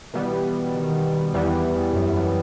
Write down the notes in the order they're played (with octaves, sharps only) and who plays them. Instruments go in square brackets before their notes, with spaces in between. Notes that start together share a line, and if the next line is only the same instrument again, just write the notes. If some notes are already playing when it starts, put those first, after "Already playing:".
[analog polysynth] B2 G3 B3 [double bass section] E3
[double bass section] D#3
[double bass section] E2 [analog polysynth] E3 G3 B3
[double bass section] F#2